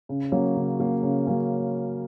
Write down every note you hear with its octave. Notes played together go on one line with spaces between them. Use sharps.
C#3
F#3 A#3 C#4
C#3
F#3 A#3 C#4
C#3
F#3 A#3 C#4